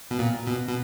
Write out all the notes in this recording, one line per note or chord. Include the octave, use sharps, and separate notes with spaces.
B2
A#2
B2
B2